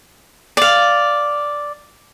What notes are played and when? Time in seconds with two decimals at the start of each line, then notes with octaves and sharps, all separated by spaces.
0.57 D5 F5